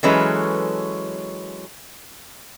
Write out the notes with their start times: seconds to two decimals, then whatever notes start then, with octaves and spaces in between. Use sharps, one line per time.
0.03 E3 F#3 G#3 C#4 A4 B4